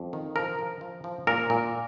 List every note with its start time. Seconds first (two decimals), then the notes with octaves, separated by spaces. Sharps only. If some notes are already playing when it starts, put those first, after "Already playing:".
Already playing: F2
0.13 D#3
0.36 F3 A#4
0.59 F3
0.81 F3
1.04 F3
1.27 A#2 A#4
1.50 A#2